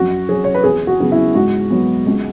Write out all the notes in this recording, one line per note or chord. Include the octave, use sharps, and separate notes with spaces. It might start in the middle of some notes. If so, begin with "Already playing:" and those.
Already playing: F#2 F#4
F#3 C#4 G#4
C#5
B4
E2 G#4
F#4
C#3 F#3 B3
E4
G#2 F#4
F#3 B3
C#2